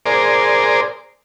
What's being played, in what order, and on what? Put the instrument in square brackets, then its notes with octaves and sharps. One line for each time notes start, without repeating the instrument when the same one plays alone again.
[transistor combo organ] G#4 A#4 C5 D5